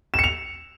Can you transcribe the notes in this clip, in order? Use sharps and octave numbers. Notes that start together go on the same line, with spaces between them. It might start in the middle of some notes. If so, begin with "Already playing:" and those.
E7
C#7
F7